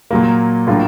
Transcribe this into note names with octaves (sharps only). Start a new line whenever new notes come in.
A#2 F#3 A#3
A2 F#3 A#3 D4 F4